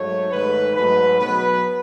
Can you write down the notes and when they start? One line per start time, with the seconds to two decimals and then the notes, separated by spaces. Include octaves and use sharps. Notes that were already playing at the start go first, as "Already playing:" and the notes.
Already playing: G#2 F#3 A3 C#5
0.31 G#2 D#3 A3 B4
0.75 G#2 F#3 A3 B4
1.20 B2 F#3 B3 B4